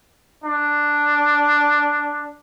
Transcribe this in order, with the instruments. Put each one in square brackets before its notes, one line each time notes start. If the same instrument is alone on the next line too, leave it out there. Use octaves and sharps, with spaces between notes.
[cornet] D4